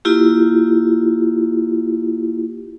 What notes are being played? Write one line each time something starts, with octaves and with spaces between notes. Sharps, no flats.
A#3 E4 F4 G4